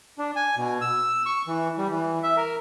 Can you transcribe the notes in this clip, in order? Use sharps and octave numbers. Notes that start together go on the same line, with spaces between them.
D4
G#5
B2
E6
C#6
E3
G3
E3
E5
A#4